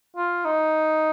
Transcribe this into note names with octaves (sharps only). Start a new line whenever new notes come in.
F4
D#4